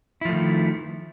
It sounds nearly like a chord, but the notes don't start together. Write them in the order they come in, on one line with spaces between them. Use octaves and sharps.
E4 F3 A3 D#3